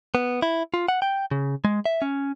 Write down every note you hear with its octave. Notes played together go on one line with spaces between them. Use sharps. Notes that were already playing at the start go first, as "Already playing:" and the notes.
B3
E4
F4
F#5
G5
C#3
G#3
E5
C#4